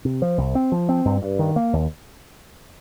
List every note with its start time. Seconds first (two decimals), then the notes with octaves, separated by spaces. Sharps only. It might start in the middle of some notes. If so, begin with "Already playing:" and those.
0.05 C3
0.22 F3
0.38 C2
0.55 C4
0.72 F3
0.89 C4
1.05 G2
1.22 G2
1.39 D#3
1.56 A#3
1.73 D#2